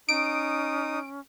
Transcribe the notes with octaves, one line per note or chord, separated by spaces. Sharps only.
C#4 D#4 D#6 D7